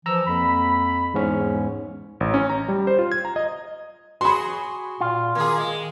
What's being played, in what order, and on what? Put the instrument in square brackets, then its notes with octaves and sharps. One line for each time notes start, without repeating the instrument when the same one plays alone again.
[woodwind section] E3 F3 [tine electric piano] A#5 E6
[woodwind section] F2 A#3 B5
[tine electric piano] E2 G#2 C#4
[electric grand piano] A1
C#4
A#5
G3
C5
F4
G#6
A#5
D#5
[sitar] F#4 G#4 [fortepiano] B5 C6
[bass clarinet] A#2 [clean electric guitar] F4
[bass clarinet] D#3 [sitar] A#3 G#4
[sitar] G#3